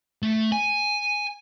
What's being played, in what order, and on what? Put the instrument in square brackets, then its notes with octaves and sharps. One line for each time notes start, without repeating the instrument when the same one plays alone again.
[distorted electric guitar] A3
G#5